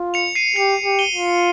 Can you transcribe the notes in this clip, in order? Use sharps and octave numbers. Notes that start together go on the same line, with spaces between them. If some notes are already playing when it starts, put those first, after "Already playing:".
Already playing: F4
C#7 F7
C7 D#7
G4 C#7 F7
G4
D#7 G7
F4